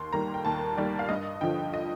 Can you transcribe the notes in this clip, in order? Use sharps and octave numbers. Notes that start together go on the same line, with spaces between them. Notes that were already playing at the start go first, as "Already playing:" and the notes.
Already playing: D#2 C6
D#3 G3 A#3 A#5
G5
D#2 A5
D#3 G3 A#3 D5
F5
G2 D#5
D3 F3 G5
D#5